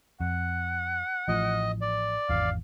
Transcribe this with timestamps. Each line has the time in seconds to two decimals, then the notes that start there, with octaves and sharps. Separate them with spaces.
0.20 F2 F#5
1.28 A1 A2 F3 D#5
1.81 D5
2.29 G#1 E2 F5